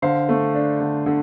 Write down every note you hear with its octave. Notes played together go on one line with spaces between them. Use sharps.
D3 C5 F5
A3
D4
D3
D3